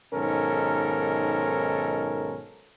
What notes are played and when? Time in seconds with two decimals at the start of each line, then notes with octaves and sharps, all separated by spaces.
0.14 B1 G#2 D#3 C#4 A4 A#4